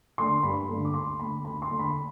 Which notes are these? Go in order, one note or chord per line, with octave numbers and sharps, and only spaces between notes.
D3 A3 D4 C6
G2 B5
D3 A3 D4
D6
D2 C6
D3 A3 B5
D2 B5
C6
D3 A3
B5